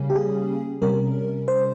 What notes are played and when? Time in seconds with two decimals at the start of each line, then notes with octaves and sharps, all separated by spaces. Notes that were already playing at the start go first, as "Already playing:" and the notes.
Already playing: C#3 G3 A#3 C#4
0.10 G4
0.15 G#4
0.82 C3 G3 C#4 A#4
1.48 C5